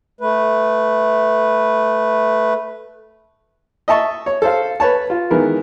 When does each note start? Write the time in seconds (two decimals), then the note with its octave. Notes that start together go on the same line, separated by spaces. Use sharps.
0.21 A3 B4
3.88 D#5 E5 A5 C#6
4.26 C#5
4.42 A4 C5 F5
4.80 B4 C#5 A5
5.10 F4
5.31 D#3 E3 G#3 B3 A#4